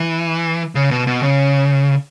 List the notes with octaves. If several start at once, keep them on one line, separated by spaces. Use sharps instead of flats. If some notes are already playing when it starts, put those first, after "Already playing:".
Already playing: E3
C#3
B2
B2
C#3